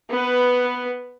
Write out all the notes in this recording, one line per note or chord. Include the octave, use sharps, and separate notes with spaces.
B3 B4